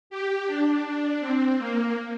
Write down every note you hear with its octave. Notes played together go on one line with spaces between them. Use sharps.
G4
D4
D4
C4
A#3